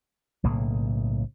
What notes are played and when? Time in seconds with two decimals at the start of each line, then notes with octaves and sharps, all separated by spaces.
0.44 B1 A2 C#3 A#3